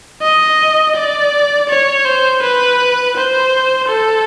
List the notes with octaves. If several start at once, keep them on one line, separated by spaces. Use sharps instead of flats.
D#5
D5
C#5
C5
B4
C5
A4